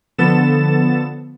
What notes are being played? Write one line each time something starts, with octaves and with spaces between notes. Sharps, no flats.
D3 F3 B3 A4 A6 E7